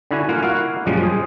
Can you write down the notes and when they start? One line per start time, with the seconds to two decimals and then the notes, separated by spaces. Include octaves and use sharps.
0.11 D3 D4 E4 F#4 G#5
0.29 A#3 F4 A#4 F5 F#5 G#5
0.43 A#3 E4 F#4 F5 F#5
0.86 F#2 A#2 C#3 F3 G3 G#3
1.03 G#4 C5